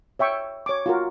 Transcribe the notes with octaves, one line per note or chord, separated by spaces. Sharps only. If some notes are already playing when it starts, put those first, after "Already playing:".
C#5 E5 G5 C#6
C#5 D6
F4 F#4 A#4